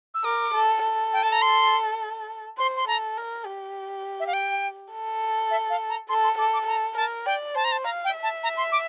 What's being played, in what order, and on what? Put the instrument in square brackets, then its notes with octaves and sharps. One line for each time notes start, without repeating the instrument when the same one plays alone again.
[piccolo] E6
[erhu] A#4 [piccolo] D6
[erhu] A4
A4
[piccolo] G5
A5
A#5
C6
[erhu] C5 [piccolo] C6
[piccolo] C6
[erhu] A4 [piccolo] A#5
[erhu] A#4
G4
[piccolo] E5
F5
G5
[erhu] A4
[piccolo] E5
F5
A#5
[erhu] A4 [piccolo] C6
[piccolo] C6
[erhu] A4 [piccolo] D6
[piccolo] D6
[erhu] A4 [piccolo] A#5
[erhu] A#4 [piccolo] A5
[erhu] D5 [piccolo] G5
[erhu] C5 [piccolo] A5
[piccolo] A#5
A5
[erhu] F5 [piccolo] A#5
[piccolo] G5
[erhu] E5
[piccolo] A5
A#5
C6
D6